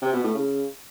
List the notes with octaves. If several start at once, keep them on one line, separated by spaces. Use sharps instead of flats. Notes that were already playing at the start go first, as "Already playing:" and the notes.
C3
B2
A2
C#3